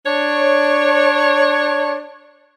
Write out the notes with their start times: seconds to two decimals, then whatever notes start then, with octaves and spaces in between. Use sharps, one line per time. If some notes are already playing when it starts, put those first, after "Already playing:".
0.05 D4 C#5